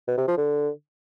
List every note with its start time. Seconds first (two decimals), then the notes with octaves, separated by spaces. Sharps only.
0.08 B2
0.18 C3
0.27 F3
0.37 D3